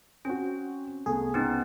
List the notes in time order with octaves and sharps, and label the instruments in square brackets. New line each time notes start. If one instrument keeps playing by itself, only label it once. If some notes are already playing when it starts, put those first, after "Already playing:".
[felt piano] C4 F#4 [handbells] C#4
[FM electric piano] C2 G#4 [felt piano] A3 B3
[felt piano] C#2 [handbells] B3 C4 D#4